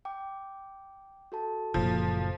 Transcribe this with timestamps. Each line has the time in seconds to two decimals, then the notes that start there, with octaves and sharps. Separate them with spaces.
0.05 G5 D6
1.32 F#4 A4 A5
1.74 F#1 A#2 F3